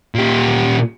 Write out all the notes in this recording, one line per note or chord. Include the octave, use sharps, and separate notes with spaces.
A#2 G4